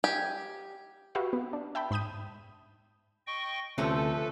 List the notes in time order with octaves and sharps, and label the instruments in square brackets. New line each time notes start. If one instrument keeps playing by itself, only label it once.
[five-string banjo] G4 G#5
[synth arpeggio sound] F#4 G4 B4 E5 F5
B3
D4
E5 G5 A5 B5
G#2 B5 D#6 G6 D#7
[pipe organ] D#5 G5 C#6
[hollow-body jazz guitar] D2 C3 C#4 [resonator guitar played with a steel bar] F3 A3 [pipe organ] A4 B4